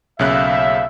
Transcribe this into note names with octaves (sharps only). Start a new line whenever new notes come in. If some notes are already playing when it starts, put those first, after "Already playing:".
B1 C#3 A3 A#3 F4 E5 F#6